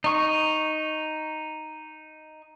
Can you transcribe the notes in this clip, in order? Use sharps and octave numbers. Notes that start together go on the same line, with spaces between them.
D#4 C#6